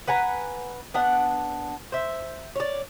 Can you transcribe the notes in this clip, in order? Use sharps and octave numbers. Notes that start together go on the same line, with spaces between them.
B4 F#5 G#5 A#5
B3 D4 F#5
C5 E5
C#5 D5